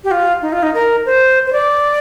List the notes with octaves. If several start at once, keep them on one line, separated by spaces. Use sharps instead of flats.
G4
F4
D#4
F4
D#4
A#4
C5
C5
D5